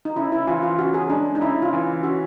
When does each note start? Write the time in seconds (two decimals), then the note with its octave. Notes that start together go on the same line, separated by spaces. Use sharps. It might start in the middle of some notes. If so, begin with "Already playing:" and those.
0.05 D#4
0.16 C#3 E4
0.32 E4
0.47 E3 F4
0.63 F4
0.79 C#3 F#4
0.94 G#4
1.10 G#3 D4
1.35 D#4
1.41 C#3 E4
1.62 F4
1.73 E3
2.03 C#3 F#4